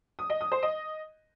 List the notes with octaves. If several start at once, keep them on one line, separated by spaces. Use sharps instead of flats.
D#6
D#5
D#6
C5
D#5